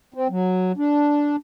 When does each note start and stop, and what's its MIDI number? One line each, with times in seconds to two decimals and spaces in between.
0.14 0.28 60
0.30 0.72 54
0.77 1.36 62